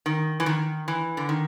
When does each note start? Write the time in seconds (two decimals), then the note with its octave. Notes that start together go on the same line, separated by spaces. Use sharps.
0.06 D#3
0.40 E3
0.46 D#3
0.88 E3
1.17 D3
1.29 D#3